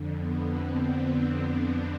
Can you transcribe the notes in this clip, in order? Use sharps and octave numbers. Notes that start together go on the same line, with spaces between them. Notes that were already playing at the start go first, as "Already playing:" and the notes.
Already playing: F2 D3
B3
C4
D4
C4
D4